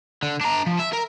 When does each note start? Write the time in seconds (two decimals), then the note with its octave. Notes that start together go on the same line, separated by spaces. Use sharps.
0.23 D3
0.41 D4 A#5
0.66 F3
0.79 E5
0.93 A#4